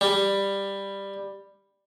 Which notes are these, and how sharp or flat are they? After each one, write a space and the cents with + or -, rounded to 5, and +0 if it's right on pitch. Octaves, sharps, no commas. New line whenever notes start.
G3 +10